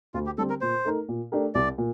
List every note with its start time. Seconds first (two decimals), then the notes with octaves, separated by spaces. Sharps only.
0.14 D2 F4
0.26 G4
0.38 D3 G3 C4 G4 A4
0.50 A#4
0.61 A#2 C5
0.85 A3 D#4 A#4
1.09 A#2
1.32 A3 D4 G4 A#4
1.55 C2 D5
1.78 A#2